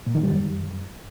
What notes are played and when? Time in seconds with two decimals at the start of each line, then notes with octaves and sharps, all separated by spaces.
0.07 A#2
0.15 D#3
0.23 G3
0.32 F#2